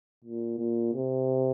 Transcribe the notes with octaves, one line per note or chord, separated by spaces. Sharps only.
A#2
A#2
C3